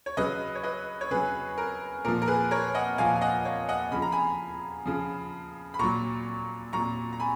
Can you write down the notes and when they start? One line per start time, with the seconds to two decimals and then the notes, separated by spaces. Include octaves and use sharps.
0.06 C#5
0.17 C#3 F#3 B4 D#5
0.55 C#5
0.63 B4 D#5
1.01 C#5
1.11 C#3 F#3 G#4 B4
1.58 A#4
2.05 A#2 F3 A#4
2.22 A#4
2.28 G#4 B4
2.51 A#4 C#5
2.75 D#5 F#5
2.98 A#2 F3 F5 G#5
3.15 G#5
3.21 D#5 F#5
3.45 C#5 F5
3.69 D#5 F#5
3.92 C#3 F3 B5
4.02 A#5
4.12 G#5 B5
4.86 C#3 F3
5.74 B5
5.79 A#2 F#3 A#5 C#6
6.73 A#2 F#3 A#5 C#6
7.13 A#5
7.20 G#5 B5